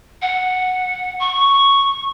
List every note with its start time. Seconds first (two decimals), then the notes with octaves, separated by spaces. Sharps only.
0.22 F#5
1.20 C#6